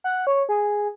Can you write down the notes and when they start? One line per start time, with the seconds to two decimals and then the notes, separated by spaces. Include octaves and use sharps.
0.04 F#5
0.27 C#5
0.49 G#4